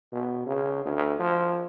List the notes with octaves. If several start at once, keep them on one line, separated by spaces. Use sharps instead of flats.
B2
C#3
D2
F3